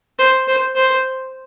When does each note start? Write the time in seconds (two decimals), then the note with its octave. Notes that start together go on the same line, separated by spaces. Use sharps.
0.19 C5
0.47 C5
0.75 C5